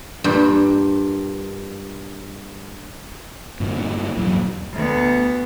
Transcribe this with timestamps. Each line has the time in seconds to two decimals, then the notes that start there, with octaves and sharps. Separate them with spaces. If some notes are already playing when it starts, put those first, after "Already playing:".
0.24 G2 A#2
3.60 G2 A#2 D3
4.17 E2 A#2 F#3
4.73 D2 B3